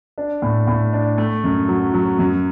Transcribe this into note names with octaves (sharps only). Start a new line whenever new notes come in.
D4
A2
A2
D4
A3
F#2
F#3
F#3
F#2